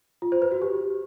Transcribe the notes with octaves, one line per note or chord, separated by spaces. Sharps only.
F4
C5
B4
F#4
G4